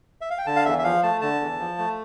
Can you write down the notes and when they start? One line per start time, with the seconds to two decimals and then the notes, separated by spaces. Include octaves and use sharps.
0.21 E5
0.30 F5
0.38 G5
0.46 D3 A5
0.56 F5
0.65 E2 E5
0.78 E5
0.83 F3 F5
1.03 A3 A5
1.21 D3 A5
1.40 E2
1.59 F3
1.78 A3